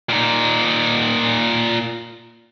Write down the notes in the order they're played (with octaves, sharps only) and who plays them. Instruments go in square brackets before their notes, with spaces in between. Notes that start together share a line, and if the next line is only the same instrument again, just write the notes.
[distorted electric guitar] A#2 D#4